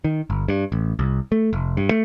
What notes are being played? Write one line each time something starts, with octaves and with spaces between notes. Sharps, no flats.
D#3
G1
G2
A1
C2
A3
F1
G2
A3